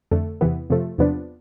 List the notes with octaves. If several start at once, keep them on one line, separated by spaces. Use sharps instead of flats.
F2 D3 A3
E2 C3 E3 B3
F2 C3 F3 A3
E2 C3 F3 B3 D4